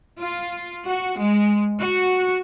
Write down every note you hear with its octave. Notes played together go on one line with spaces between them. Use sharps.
F4
F#4
G#3
F#4